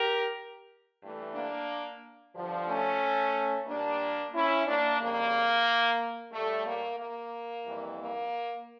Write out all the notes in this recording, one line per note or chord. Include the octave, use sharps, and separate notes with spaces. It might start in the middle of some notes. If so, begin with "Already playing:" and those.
Already playing: G4 A#4
G2 E3 A3
A#3 D4
G2 D3 F3
A3 C#4
A#2 G3 A#3 D4
C#4 E4
A#3 D4
F2 C#3 G3 A#3
A2 G3 A3
A#3
A#3
F2 E3 G3
A#3